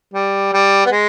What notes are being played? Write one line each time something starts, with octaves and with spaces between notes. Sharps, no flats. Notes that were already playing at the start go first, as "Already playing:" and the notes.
G3
G3
B3
G#3